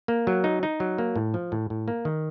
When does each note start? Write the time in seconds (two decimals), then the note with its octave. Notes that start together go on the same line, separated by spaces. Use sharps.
0.08 A#3
0.27 F#3
0.44 D#4
0.63 D#4
0.80 F#3
0.98 A#3
1.16 A2
1.34 F3
1.52 A2
1.70 A2
1.88 A#3
2.05 D#3